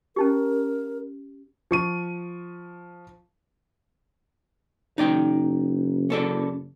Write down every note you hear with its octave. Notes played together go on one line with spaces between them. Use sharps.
C#4 D#4 G4 A#4
F3 C#6 D#7
F#1 D#4 D5 G5
C#4 A4 D5